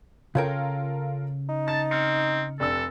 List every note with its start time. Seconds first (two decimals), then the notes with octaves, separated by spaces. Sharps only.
0.35 C#3 F4 A4 A#4 C#5 G5
1.49 D#4
1.68 A5 A6
1.91 C4 F6 C#7
2.60 F1 G3 D4 A4 E6